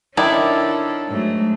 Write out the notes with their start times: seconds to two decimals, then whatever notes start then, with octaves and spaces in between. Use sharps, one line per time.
0.17 D#3 C#4 D4 E4 A4 D5
1.09 G#2 F#3 A3